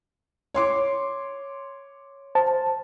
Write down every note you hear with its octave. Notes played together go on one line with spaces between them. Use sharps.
C#5 C6 D6
C5 A5